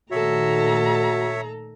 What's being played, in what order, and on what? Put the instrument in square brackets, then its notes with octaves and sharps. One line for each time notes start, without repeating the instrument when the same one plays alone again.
[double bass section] A#2 D#3 A3 [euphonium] F#4 [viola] A4 A#5 [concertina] C#5 E5